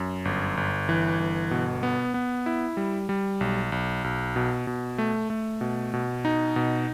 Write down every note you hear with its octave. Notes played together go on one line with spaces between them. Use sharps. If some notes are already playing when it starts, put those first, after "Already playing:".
Already playing: F#2
G1
G1
E3
G1
B2
B3
B3
E4
G3
G3
B1
B1
B1
B2
B2
A3
A3
B2
B2
D#4
B2